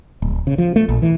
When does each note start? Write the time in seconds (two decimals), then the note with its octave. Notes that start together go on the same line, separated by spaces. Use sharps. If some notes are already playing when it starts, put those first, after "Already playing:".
0.22 D1
0.47 C#3
0.58 F3
0.76 A3
0.89 A#1
1.02 E3